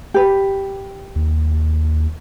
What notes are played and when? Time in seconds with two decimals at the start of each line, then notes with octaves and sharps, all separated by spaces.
0.14 G4 B4
1.16 D#2